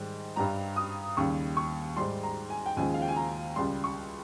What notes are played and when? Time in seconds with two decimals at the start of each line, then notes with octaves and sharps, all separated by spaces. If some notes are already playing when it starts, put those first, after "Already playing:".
Already playing: G#2 D#3 G3
0.36 G2 G3 A#5
0.76 D#6
1.17 D#2 C#3 G3 C#6
1.57 C#6
1.96 G#2 G3 C6
2.23 A#5
2.50 G#5
2.66 G5
2.77 D#2 C#3 F3 G#3 G#5
2.94 F5
3.02 G5
3.08 G#5
3.16 A#5
3.56 C#2 C#3 G3 C6
3.84 C#6